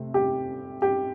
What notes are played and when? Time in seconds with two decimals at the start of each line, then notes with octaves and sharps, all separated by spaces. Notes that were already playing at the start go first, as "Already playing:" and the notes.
Already playing: C3 A3 C4
0.14 G4
0.82 G4